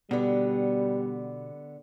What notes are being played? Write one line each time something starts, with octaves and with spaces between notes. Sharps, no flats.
B2 D3 G3 B3